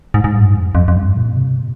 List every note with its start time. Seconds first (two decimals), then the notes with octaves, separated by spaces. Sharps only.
0.14 G#2
0.24 G#2
0.34 G2
0.55 F2
0.75 F2
0.88 F2
0.96 G2
1.17 A#2
1.36 C3
1.57 A#2